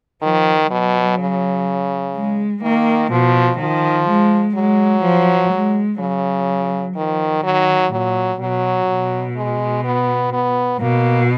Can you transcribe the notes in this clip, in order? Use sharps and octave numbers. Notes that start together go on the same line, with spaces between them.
D#3 F3
B2 F#3
C#3
G#3
D#3 A#3
B2 F3
D#3 F3
G#3
F#3 G#3
F3
G#3
C#3 F#3
D#3 F3
D#3 F#3
A#2 F#3
B2 F#3
B2
G#3
B3
B3
B2 A#3